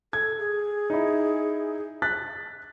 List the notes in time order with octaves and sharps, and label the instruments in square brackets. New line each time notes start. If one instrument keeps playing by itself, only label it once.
[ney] A4 [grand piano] G#6
[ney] G#4
[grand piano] D#4 E4
F#6 A6 B6